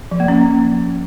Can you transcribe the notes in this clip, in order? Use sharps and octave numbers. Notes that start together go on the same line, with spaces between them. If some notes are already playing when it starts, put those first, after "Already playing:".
F3
A#3
C#4